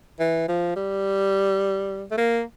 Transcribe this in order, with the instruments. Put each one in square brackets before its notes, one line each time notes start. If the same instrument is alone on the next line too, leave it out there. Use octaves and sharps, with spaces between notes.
[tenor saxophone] E3
F3
G3
A3
A#3